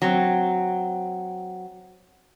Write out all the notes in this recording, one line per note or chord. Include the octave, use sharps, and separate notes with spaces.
F#3 C4